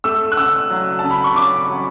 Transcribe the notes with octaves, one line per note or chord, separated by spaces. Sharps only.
A3 E6
F#6
C#3 E6
F#3
C#3 A5
B5
C#6
C#4 D6
F#3